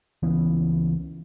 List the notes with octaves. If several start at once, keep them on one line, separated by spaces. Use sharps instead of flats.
C#2 E3 B3